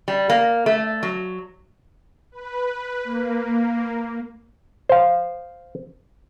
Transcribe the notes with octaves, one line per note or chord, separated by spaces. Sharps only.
G3
A#3
A3
F#3
B4
A#3
C5 F5